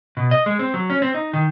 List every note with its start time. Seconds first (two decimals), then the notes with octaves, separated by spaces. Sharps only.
0.17 B2
0.31 D#5
0.46 G#3
0.59 C4
0.74 F#3
0.90 C#4
1.02 C4
1.14 D#4
1.33 D#3